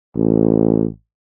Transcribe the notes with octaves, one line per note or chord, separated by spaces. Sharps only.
A1